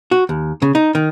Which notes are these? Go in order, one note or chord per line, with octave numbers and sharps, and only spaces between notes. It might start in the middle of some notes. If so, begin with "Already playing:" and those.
F#4
D#2
C#3
D#4
D#3